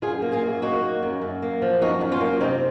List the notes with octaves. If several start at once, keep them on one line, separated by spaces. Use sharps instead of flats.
F#2 F4 G#4
A#3
F4 G#4
F#2
A#3 D#4 F#4
A#3
F#2
F#2
A#3
F3
F#2 D#4 F#4
F#2
C#4 F4
A#3
C3 C4 D#4